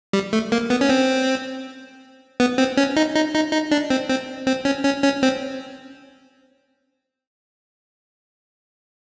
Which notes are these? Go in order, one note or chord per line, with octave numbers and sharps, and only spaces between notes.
G3
A3
A#3
B3
C#4
C4
B3
C4
C#4
D#4
D#4
D#4
D#4
D4
C4
C4
C4
C#4
C#4
C#4
C4